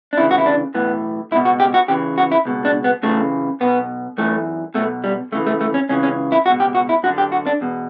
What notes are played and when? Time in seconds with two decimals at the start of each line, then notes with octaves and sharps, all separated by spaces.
0.13 D4
0.17 D2 C#3 E3 E4
0.31 F#4
0.38 E4
0.46 D4
0.74 B1 A2 E3 B3
1.31 C#2 E4
1.35 B2
1.45 F#4
1.60 G4
1.74 F#4
1.88 E2 C#3 E3 G4
2.18 F#4
2.32 E4
2.45 C#2 B2
2.65 D4
2.84 B3
3.03 F#2 C#3 E3 A3
3.61 B1 B2 B3
4.18 F#2 E3 A3
4.74 B1 B2 A3
5.04 G3
5.32 D2 C#3 E3 A3
5.47 A3
5.61 A3
5.74 C#4
5.89 C#2 C#3 E3 C#4
6.03 C#4
6.32 E4
6.46 C#2 B2 F#4
6.60 G4
6.75 F#4
6.89 E4
7.03 F#2 D3 F#4
7.18 G4
7.32 F#4
7.47 D4
7.61 E2 B2